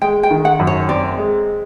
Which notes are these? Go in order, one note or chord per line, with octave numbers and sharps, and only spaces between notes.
G#3 G5
G5
D#3
F#5
F#2
C#5
C4 D5
G#3